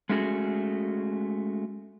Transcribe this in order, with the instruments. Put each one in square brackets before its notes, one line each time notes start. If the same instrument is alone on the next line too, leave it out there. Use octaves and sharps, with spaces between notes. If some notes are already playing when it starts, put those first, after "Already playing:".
[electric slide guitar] G#3 A3 C#4 F#4 G#4